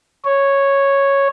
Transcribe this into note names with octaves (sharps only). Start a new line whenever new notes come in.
C#5